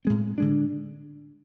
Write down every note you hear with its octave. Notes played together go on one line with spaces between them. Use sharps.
A2 G#3 C4
D3 G#3 D4